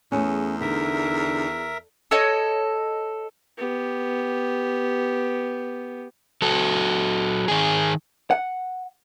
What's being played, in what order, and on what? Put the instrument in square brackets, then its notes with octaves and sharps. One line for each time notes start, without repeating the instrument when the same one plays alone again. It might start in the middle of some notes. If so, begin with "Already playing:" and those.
[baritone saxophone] E2 [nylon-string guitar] A3 C#4 [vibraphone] G#4 D#6
[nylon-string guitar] D3 [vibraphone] D4 D#4 A4 [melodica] A#4 E5
[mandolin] A4 C#5 D#5
[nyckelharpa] B3 G4
[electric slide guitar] F#3 F#4 A4
D#3 G#4
[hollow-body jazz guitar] F#5